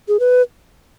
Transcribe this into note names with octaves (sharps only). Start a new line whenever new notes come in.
G#4
B4